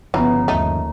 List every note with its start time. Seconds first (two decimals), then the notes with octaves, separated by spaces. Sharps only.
0.14 G1 C#3 E3 F3 B3 C#5 A#5
0.48 D#2 A3 D#4